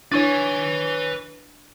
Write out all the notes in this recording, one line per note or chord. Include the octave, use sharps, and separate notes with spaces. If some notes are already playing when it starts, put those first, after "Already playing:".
D4 E4 B4 C#5 G#5 C#6 A6